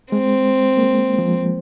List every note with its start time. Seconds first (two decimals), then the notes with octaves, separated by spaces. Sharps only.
0.12 G#3 C4
0.77 A#3
0.83 G#3
1.18 F3